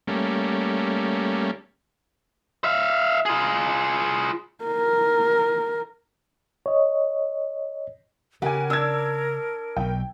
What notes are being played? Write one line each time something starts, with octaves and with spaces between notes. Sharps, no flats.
G3 A3 A#3 C#4
E5 F5
F4 G#4
A#4
C#5 D#5
C#3 G4 A#4 F#5 G#5
D4 E6 G#6
B1 B2 G5